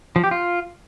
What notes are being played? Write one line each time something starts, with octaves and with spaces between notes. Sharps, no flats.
F3
G4
F4